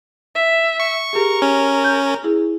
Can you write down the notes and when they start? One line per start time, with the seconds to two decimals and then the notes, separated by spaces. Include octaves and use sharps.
0.35 E5
0.80 C#6
1.13 G4 G#4 A#4
1.42 C#4
1.84 G6
2.24 E4 G#4